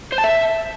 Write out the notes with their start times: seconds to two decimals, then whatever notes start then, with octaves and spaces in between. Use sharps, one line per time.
0.12 C5
0.18 A5
0.24 E5